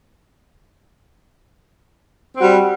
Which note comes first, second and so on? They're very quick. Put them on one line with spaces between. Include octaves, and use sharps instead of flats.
C4 F#4 G3